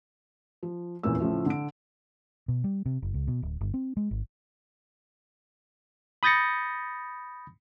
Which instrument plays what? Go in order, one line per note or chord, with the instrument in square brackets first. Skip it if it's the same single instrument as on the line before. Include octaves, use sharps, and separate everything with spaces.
[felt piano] F3
F1 E2 A#2 A#3 C#4 E6
A2 C#3 F3 A3
D3 D7
[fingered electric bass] B2
G3
C3
F#1
C#2
B2
D1
G1
C4
G#3
G#1
[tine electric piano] B5 D#6 G6 A6 A#6 C#7